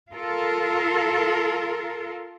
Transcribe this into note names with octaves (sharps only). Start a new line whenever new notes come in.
F4 A4 A#4